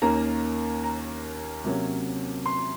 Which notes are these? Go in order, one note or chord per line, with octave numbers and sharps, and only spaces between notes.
D#2 D#3 A#3 C#4 A#5
A#5
C3 F#3 A#3 C#4
C6